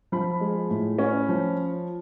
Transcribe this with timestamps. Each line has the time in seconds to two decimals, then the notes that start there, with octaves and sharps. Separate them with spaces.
0.12 F3 B5
0.41 G#3
0.70 A2
0.99 C#4
1.29 F3